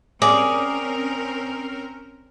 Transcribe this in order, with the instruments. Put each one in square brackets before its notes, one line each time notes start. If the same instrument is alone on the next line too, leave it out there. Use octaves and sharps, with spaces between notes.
[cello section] C4 C#4 A#4 [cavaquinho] G#4 [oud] D5